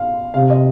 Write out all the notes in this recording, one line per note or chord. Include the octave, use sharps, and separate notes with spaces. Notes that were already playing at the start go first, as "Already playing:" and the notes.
Already playing: F5
C3 F5
D#5